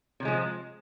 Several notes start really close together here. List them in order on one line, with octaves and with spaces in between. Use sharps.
C3 F#3 G#3 F3